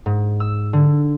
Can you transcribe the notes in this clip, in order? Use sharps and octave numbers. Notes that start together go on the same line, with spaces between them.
G#2
E6
D3